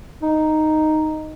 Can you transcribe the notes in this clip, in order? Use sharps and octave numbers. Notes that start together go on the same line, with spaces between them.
D#4